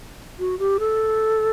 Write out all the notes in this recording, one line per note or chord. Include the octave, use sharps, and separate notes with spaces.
F#4
G4
A4